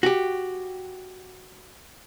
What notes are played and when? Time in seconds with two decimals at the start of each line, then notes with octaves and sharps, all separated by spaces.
0.03 F#4 G4